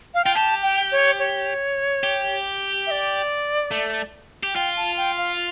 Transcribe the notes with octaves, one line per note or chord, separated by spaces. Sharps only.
F5
F4 G5
G4 A5
G5
C#5
C#5
G4
E5
D5
A3
G4
F4 G5
A5
G5
F5